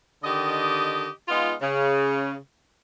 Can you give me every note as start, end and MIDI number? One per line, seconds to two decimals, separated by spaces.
0.23 1.07 50
0.23 1.07 51
0.23 1.07 67
0.23 1.07 75
1.28 1.52 56
1.28 1.52 59
1.28 1.52 63
1.28 1.52 65
1.61 2.34 49